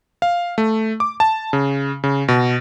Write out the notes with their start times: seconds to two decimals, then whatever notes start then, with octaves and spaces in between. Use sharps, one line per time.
0.22 F5
0.58 A3
1.00 D6
1.20 A5
1.53 C#3
2.04 C#3
2.28 B2